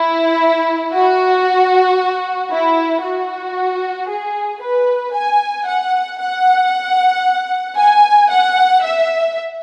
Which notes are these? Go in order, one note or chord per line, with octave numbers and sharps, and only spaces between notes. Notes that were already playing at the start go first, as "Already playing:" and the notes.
Already playing: E4
F#4
E4
F#4
G#4
B4
G#5
F#5
F#5
G#5
F#5
E5